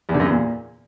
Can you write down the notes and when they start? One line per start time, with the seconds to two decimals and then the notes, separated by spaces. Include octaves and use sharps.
0.09 E2
0.14 D3
0.20 F#2
0.25 E2
0.31 A#2